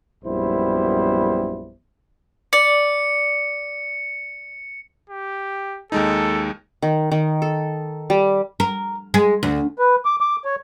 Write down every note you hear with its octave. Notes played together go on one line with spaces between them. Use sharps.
A#1 F#2 G3 B3 E4 C5
D5 C#7
G4
D#2 G#3 D#4 A4
D#3
D#3
A4
G3
A#4
G#3
D2
B4
D6
D6
C#5